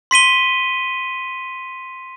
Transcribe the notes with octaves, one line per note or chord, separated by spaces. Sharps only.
C6 B6 D#7 G7